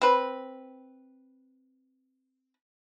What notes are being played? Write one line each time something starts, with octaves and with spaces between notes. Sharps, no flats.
C4 B4